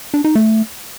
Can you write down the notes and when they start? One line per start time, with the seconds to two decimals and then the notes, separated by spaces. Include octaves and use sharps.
0.14 D4
0.24 D#4
0.35 A3